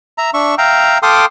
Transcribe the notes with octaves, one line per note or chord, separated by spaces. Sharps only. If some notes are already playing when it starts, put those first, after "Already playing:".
E5 A#5
D4 E5 C#6
E5 F5 G5 A#5
A4 F5 G5 C6 D6 D#6